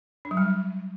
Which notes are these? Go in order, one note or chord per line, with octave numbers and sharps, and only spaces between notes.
D4
F#3
G3